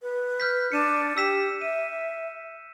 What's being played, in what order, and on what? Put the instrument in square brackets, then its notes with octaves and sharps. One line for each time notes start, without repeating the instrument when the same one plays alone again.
[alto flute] B4
[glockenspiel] F6 G6 B6
[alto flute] D4 [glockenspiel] C#7 D#7 E7
[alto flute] G4 [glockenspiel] E6 B6 E7
[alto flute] E5 [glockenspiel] D#7